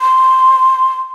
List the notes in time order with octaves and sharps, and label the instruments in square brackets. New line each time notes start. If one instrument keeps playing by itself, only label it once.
[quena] C6